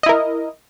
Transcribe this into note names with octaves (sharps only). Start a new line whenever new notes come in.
E4 A#4 D#5